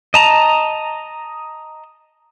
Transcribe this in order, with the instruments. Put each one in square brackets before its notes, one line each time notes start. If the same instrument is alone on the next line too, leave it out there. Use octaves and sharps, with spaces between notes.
[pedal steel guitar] D#5 A5 A#5